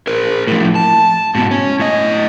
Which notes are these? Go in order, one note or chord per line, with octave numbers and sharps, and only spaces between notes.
A#4 C5
A2 F3
A5
G#2 B2
C#4
A2 D#5